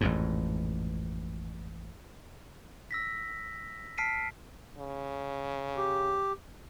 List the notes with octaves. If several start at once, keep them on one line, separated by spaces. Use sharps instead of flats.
A1 F2 G#2
E6 A#6 B6
A5 F6 B6 C7 D7 D#7
C#3
G4